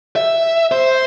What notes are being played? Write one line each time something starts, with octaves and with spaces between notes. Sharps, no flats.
E5
C5